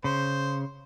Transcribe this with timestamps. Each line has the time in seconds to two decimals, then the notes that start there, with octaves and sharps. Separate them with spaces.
0.04 C#3 C5